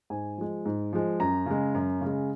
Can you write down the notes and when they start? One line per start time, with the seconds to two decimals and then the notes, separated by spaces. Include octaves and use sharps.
0.10 G#2 G#5
0.38 F3 G#3
0.65 G#2
0.93 F3 G#3
1.20 F#2 A#5
1.46 C#3 G#3
1.74 F#2
2.01 C#3 G#3